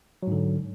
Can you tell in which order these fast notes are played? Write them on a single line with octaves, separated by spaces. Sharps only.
F#3 G#2 D3